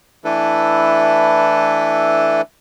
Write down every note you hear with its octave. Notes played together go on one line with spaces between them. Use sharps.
E3 A3 D4 E4 A4 B4